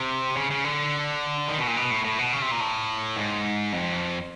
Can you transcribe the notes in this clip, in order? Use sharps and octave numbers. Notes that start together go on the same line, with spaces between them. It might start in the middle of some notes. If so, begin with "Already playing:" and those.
Already playing: C3
C#3
C#3
D3
D#3
B2
A#2
B2
A2
A2
B2
C#3
C3
A#2
A2
G#2
F2